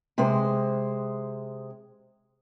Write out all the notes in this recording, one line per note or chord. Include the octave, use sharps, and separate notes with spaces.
C3 G#3 C5